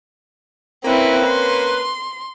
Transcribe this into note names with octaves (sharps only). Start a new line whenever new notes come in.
A#3 C4 C#4 E4 B4
C6